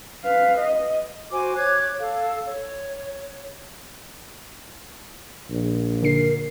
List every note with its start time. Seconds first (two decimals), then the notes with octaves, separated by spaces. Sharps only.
0.24 B4 F5
0.58 D#5
1.31 F#4 C5 G#5 D6
1.56 C#5 D6 F#6 G#6
2.00 A4 F5
2.46 C#5
5.50 A#1
6.03 D3 A#4 C7